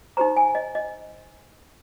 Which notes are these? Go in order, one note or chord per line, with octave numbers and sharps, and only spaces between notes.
D#4 G4 C5 A#5
G#5
D#5
D#5